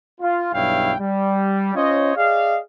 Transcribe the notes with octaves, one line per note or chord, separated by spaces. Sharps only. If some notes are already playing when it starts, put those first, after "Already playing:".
F4
B1 G2 E4 C#5 F5 G5
G3
C#4 F4 C5 C#5 D#5
G#4 D5 D#5 F5